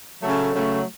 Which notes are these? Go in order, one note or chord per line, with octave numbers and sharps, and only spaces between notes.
C#3 F#3 A3
C#3 F#3 A3